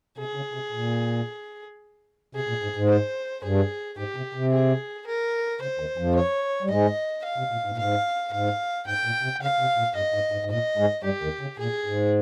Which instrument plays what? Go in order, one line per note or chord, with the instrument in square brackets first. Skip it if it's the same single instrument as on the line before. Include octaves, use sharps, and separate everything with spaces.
[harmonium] C3 [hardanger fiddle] G#4
[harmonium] C#3
C3
A#2
[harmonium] C3 [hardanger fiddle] G#4
[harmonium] A#2
G#2
G#2
[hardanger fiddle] C5
[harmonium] G2 [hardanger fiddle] G#4
[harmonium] G#2 [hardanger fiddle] G4
[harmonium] C3
C3
[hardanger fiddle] G#4
A#4
[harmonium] C#3 [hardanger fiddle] C5
[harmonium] D#2 D#3
F2 F3
[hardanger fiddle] C#5
[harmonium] G3
[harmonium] G#2 G#3 [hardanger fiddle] D#5
[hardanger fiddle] F5
[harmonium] C3
A#2
G#2
A#2
[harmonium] G#2 [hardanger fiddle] F5
[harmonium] G#2 [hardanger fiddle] F5
[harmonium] G#2 [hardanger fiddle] G5
[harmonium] A#2
C3
[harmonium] C#3 [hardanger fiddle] F5
[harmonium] C3
A#2
[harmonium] G2 [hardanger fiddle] D#5
[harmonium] G#2
G#2
G#2
[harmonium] A#2 [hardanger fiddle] D#5
[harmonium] G#2 G#3
[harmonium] G2 G3 [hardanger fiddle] G4
[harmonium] D#2 D#3
C#3
[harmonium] A#2 [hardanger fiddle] G#4
[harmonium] G#2